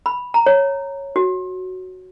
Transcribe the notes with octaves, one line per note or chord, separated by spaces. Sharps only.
B5
A#5
C#5
F#4